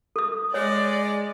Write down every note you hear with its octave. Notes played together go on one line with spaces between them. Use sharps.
A4 D#6
G#3 C#5 D5